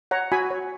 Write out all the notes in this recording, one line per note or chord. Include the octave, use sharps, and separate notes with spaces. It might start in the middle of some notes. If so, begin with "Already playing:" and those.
C#5 F#5 A#5
F#4 G#5 B5
C#5